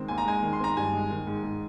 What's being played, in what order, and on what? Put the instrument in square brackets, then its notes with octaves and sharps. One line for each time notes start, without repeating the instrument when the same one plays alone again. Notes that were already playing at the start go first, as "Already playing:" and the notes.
Already playing: [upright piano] D#3 G#3 C4
D#2 G#5
A#5
G#3 G#5
D#3
C6
C4 A#5
G2 G#5
G#3
D#3
G#2
G#2